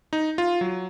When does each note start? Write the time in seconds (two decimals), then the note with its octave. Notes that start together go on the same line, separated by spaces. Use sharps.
0.13 D#4
0.38 F4
0.61 F#3